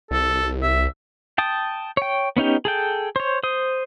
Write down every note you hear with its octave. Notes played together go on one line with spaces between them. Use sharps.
C2 A4
E5
G5 A5 D#6
C#5 G5
B3 C#4 D#4 G4
G#4 A4 G5
C5 C#5
C5 D#6